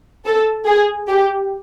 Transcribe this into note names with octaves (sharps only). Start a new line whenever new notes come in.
A4
G#4
G4